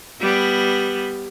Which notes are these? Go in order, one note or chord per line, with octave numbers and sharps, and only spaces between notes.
G3 B3